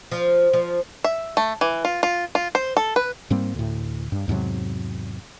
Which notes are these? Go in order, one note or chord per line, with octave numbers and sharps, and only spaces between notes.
F3
F3
E5
A3
E3
F4
F4
F4
C5
A4
B4
G#2 G3 A#3 C4
D2 A2
G2
E2 G#2 C3 F#3